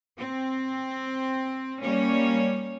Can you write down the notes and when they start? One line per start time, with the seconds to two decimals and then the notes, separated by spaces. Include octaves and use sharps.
0.19 C4
1.82 G3 A#3 C#4 C#5